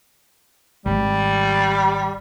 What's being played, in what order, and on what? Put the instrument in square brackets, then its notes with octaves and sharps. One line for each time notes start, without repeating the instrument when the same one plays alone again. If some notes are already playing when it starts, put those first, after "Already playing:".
[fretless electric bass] G#1 [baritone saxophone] G3